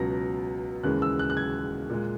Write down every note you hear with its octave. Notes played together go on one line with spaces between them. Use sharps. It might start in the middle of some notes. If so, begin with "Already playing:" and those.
Already playing: C#2 B2 F#3 A#6
D#2 C#3 E3 G#3 F#6
E6
F#6
F#6
G#6
A#2 G#3